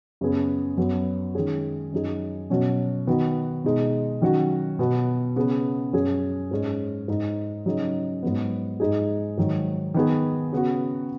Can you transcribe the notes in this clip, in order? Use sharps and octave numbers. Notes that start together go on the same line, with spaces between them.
F#2 C#3 B3 G#4
F#2 F#3 B3 F#4
D#3 G#3 C#4 G#4
F#2 F#3 D#4 G#4
B2 F#3 C#4 F#4
D#3 B3 F#4
B2 G#3 D#4
D#3 F#3 C#4 F#4
B2 B3 F#4
C#3 B3 G#4
F#2 F#3 C#4 G#4
G#2 G#3 C#4
G#2 G#3 D#4
C#3 F#3 D#4 G#4
G#2 F#3 B3
G#2 G#3 D#4 G#4
G#2 D#3 F#3
D#3 B3 G#4
C#3 B3 F#4